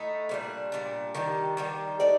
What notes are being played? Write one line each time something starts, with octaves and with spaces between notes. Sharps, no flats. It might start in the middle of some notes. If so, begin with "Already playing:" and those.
Already playing: A2 A3 D#4
A#2 G3 D4
A#2 G3 D4
D#3 G3 D4 G4
D#3 G3 D4 G4
A3 D#4 A4 D5